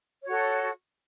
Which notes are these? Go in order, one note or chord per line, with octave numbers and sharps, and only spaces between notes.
F#4 A4 C#5